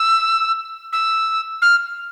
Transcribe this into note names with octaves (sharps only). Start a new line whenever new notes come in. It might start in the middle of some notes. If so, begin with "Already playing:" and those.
Already playing: E6
E6
F6